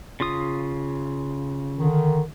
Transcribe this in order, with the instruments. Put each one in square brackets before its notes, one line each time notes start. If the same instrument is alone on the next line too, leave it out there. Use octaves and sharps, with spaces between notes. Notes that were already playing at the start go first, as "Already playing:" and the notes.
[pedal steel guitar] C#3 F4 D#6
[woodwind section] D3 D#3